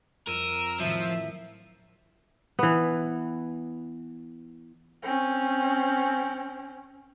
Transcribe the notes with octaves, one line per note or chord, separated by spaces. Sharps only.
F2 A#4 E6 D#7
A2 D#3 F3 F#3 E5
E3 B3
C4 C#4